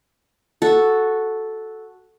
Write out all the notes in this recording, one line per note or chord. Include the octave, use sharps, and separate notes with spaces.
F#4 A4